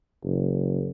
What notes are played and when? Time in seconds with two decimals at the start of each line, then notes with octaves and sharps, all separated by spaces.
0.24 F#1